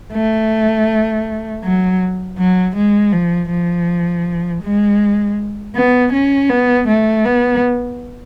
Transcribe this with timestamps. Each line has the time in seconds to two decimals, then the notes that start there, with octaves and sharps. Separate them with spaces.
0.13 A3
1.63 F#3
2.38 F#3
2.76 G#3
3.12 F3
3.50 F3
4.63 G#3
5.75 B3
6.13 C#4
6.50 B3
6.88 A3
7.25 B3